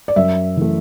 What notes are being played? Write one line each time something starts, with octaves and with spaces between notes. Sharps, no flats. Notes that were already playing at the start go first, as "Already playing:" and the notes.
D5
F#2 E5
E3 A3